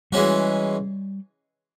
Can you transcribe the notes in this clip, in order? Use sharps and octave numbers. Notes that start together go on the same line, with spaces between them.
E3 G3 G#3 C#4 F#4